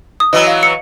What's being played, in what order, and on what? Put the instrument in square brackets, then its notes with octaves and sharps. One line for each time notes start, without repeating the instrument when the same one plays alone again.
[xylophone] D#6
[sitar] E3 F#3 [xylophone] D#5
[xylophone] F5
C#7